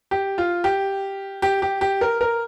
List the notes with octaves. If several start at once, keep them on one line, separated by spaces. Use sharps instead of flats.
G4
F4
G4
G4
G4
G4
A#4
A#4